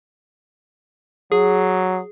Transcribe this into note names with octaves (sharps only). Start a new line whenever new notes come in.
F#3 G#4